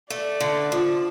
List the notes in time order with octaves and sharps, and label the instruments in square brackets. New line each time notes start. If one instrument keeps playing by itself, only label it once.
[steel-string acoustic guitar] A3 [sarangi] D5
[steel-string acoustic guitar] D3
F3